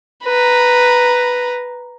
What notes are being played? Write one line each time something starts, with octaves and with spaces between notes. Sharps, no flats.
B4 A#5